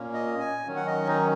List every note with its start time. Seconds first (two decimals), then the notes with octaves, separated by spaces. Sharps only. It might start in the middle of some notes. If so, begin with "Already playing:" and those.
Already playing: A#2 A#3 C#4
0.13 D#5
0.40 G#5
0.67 D#3 F#3 C#4
0.76 F#5
0.87 D#5
1.07 D#4